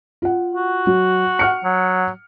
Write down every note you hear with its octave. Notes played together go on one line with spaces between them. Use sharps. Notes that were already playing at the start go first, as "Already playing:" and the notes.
F4 F#5
F#4
F#3
F#5 F6 C#7
F#3